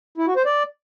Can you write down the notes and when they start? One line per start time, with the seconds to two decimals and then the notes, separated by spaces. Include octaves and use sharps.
0.18 E4
0.27 F#4
0.36 C5
0.46 D5